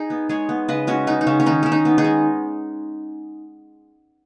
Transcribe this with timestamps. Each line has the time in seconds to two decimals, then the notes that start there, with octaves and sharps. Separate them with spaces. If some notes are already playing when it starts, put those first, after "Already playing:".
Already playing: D#4 G#4
0.10 B3
0.29 G#3 G#4 C#5
0.49 B3
0.68 C#3 B4 D#5
0.87 G#3 C#4 F#4
1.07 B3 D#4
1.21 D#4
1.27 C#3 C#4
1.40 C#4
1.46 D#3 D#4
1.63 D#3 C#4
1.72 D#4
1.85 B3
1.98 D#4 G#4
2.05 G#3